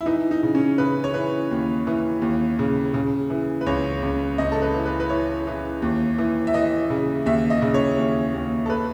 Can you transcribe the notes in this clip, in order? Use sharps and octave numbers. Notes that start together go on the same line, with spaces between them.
E4
E3 D#4
D#4
C#3
C#4
C#3 B4
C#5
E3 B4
D#2
E3
D#2
C#3
C#3
E3
B4
C#2 C#5
C#2
C#2 D#5
A4
B4
E3
B4
B4
E3 C#5
E3
D#2
E3
E5
E3 D#5
C#3
D#2 E5
D#5
C#3
C#5
D#2
D#2
A4
B4